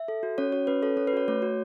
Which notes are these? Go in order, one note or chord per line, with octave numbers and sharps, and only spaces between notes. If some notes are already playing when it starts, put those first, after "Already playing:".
Already playing: E5
A4
F#4
C#4 C#5
F#4 C#5
C#4 B4
A4 C#5
C#4 C#5
B4
F#4 C#5
A3 C#5
F#4